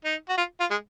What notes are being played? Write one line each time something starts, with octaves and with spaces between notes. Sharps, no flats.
D#4
F#4
F4
F4
G#3